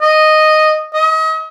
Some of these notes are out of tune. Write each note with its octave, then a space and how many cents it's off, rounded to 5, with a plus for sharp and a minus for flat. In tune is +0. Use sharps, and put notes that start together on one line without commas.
D#5 -5
D#5 +35